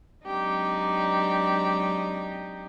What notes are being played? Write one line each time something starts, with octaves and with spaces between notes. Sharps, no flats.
F#3 G#3 C4 D4 D#4 G4